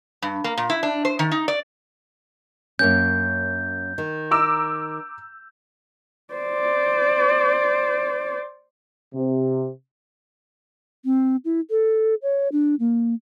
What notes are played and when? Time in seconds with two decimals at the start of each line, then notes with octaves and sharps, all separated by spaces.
0.22 G2
0.44 A#3
0.57 A#2
0.70 E4
0.83 D4
1.05 C5
1.19 D#3
1.31 D#4
1.48 D5
2.79 F#2 A#3 C#4 G6
3.98 D#3
4.31 A#5 D6 E6
6.33 C5 D5
9.14 C3
11.04 C4
11.45 E4
11.70 A4
12.22 C#5
12.52 D4
12.80 A#3